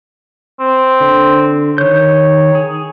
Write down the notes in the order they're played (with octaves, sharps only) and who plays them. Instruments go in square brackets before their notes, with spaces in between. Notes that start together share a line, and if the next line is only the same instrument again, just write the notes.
[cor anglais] C4
[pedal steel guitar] D3
[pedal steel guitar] D#3 G6 [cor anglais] C#5
[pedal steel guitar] G#4